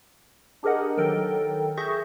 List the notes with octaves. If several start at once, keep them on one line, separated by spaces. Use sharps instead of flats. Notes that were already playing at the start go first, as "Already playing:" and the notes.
D4 G4 G#4 A#4 D#5 F#5
D#3 F#3 A4 A#4 G5
G#4 E5 C#6 G6 A#6